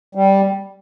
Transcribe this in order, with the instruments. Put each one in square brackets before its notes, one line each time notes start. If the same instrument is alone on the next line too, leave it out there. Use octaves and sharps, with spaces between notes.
[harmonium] G3